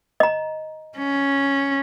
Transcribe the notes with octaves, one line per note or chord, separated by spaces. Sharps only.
D#5 A#5
C#4